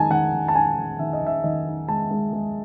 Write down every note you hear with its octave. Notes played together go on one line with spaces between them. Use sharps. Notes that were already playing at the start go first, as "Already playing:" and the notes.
Already playing: D#3 G#3 D#4 G#5 A5
D#3 F#5
D#3
A5
D#4 G#5
D#3
D#3 E5
D#5
D#3
E5
D#3 D#5
D#4
G#3 A5
G#3
G#3